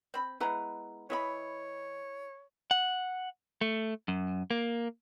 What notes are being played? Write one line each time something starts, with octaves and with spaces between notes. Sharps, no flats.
C4 B5
G#3 B3 E4 B4 A#5
E3 E4 C#5 D#5 B5
F#5
A3
F#2
A#3